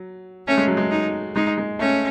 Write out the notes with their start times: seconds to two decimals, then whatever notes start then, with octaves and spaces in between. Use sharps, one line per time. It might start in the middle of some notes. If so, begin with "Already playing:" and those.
Already playing: F#3
0.47 A3 C#4
0.57 G#3
0.68 F#3
0.77 G#3
0.91 D#4
1.35 G#3 D#4
1.58 G#3
1.79 A3 C#4